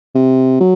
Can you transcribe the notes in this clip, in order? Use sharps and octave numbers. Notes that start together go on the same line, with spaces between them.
C3
F#3